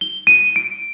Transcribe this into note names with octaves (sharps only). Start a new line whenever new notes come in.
G7
D#7
D7